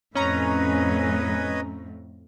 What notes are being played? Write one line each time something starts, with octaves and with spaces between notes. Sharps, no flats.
F2 A2 C#4 B4 C#5 D#5 A#5